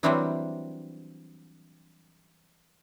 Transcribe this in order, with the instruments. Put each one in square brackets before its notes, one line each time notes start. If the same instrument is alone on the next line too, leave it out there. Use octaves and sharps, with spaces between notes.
[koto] E3 F#3 G3 C4 D4 E4